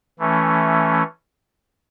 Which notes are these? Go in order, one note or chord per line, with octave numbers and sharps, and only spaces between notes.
E3 A3 C#4